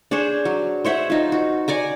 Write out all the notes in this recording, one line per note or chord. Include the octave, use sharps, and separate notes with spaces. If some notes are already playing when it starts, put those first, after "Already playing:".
D4 G#4 C5 C#5
F#3
C5 C#5 E5 F#5
D#4 F4
F#4
C#5 D5 G#5 A#5